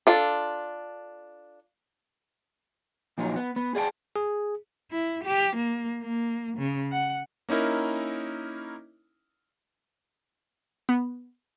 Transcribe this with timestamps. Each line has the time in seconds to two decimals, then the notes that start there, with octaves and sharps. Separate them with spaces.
0.07 D4 F4 A4
3.18 A#2 F3 F#3 D#4
3.36 B3
3.56 B3
3.75 G#4 D5 F5 G5 A5
4.16 G#4
4.91 E4
5.24 G4
5.57 A#3
6.02 A#3
6.58 C#3
6.92 F#5
7.49 A#3 C#4 D#4 E4 A#4
10.89 B3